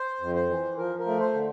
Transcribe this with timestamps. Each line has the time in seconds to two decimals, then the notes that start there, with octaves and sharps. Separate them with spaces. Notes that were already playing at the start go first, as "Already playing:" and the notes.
Already playing: C5
0.21 F2
0.35 C5
0.49 E3
0.77 F3 A#4
0.99 A#4
1.06 A3
1.20 C5
1.34 D3